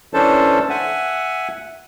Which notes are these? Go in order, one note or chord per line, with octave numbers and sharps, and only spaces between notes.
E3 C#4 D4 A4 C5 A5
E5 F#5 G#5